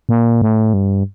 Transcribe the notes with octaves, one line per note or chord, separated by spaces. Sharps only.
A#2
A2
G2